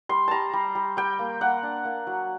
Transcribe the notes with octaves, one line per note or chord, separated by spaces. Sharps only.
G3 C6
G3 A5 A#5
G3
G3
G3 G5
A#3
A#3 F#5
D4
A#3
F#3